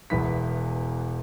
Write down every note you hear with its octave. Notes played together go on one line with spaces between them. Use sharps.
E1 E2 E3 B3 B6